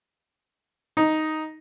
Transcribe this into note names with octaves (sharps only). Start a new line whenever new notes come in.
D#4